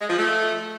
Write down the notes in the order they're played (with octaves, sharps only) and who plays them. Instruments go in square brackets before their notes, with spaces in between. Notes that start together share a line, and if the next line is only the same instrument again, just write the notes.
[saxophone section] G#3
F3
A3